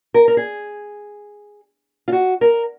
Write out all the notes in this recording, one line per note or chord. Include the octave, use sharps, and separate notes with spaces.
A#4
A#4
G#4
F4
F#4
A#4